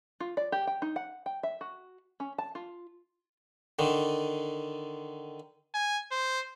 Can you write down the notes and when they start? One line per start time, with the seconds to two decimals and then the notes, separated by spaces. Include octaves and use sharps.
0.20 F4
0.37 D5
0.52 G4
0.67 G5
0.82 D#4
0.96 F#5
1.26 G5
1.43 E5
1.61 F#4
2.20 C#4
2.38 A5
2.55 F4
3.79 D3 D#3
5.74 G#5
6.12 C5